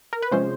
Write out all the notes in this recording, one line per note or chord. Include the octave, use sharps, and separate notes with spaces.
A#4
B4
C3 F3 G#3 C#4 C5